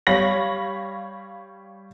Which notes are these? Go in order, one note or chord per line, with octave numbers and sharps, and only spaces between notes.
G3 C#5 F5 B5 A#6 F#7